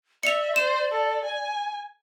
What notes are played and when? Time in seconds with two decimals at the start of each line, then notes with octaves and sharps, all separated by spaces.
0.23 D5 E5 C#7 F7
0.56 C5 E7
0.92 A4
1.25 G#5